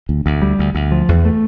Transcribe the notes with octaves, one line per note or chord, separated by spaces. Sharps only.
D2
D2
G3
D2
D2
F3
E2
A3